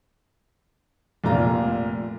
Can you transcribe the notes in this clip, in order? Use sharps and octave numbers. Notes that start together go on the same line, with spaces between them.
F1 A#2 F4 A#5